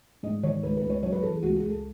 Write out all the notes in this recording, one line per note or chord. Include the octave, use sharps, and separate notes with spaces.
G#2 D#5
D#3 C#5
C#2 B4
B4
C#2
C#5
F#2 C#5
B4
E3 A4
G#4
C#2 F#4
G#4
C#2
A4